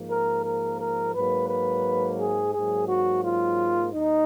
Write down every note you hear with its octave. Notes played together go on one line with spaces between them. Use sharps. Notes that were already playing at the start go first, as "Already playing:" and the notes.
Already playing: G#2 F3 A#3
A#4
A#4
A#4
G#2 F#3 A#3 B4
B4
G#4
G#2 F#3 A#3 G#4
F#4
F4
D#2 D#4